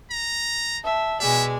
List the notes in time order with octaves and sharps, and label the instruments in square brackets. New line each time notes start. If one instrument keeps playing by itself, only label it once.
[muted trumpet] A#5
[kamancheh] E5 A5
[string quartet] B2 G#3 [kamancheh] D5 G#5 [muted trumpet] E5